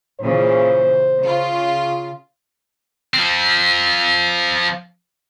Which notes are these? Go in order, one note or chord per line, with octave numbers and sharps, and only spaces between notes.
A#2 C#3 E3 C5
C#3 F4
F3 C4